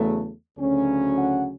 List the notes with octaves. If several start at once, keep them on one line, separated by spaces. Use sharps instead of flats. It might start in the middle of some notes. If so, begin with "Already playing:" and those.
Already playing: E2 C#3 F#3 A3
D2 C#3 F#3 C#4
F#5